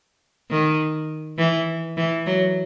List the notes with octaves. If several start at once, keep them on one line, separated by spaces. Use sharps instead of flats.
D#3
E3
E3
F#3